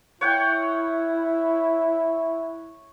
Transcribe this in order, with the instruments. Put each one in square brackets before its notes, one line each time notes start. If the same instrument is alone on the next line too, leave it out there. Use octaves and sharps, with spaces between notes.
[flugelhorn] E4 [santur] C#5 F#5 G5